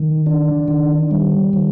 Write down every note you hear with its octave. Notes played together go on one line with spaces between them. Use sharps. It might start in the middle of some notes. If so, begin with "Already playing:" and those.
Already playing: D#3
D4
D#3
G3
D#3